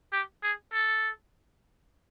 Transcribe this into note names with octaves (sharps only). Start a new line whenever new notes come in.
G4
G#4
A4